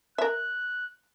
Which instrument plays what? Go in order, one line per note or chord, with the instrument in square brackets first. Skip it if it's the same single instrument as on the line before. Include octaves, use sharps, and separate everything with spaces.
[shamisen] A#4 E5 [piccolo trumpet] F#6